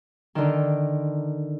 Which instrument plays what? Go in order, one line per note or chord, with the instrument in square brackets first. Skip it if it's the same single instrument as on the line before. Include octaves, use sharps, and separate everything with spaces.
[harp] D3 D#3